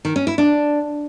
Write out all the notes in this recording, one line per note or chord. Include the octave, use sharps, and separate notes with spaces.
D#3
C#4
E4
D4